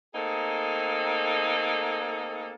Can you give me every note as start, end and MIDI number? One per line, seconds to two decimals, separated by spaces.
0.15 2.52 57
0.15 2.52 58
0.15 2.52 60
0.15 2.52 63
0.15 2.52 68
0.15 2.52 69